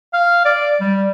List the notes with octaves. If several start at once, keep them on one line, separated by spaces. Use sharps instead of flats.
F5
D5
G3